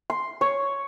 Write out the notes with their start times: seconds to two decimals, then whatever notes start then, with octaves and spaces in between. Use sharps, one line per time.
0.10 C6
0.41 C#5